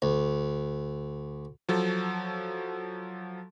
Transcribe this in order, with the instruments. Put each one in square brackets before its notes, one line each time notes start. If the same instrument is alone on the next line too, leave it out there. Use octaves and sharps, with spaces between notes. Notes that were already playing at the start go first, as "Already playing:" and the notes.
[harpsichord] D2
[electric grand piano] F3 F#3 A4